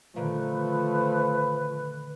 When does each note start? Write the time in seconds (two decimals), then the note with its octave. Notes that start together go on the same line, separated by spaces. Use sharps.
0.16 A#2 D3 D#3 F3 A3 B4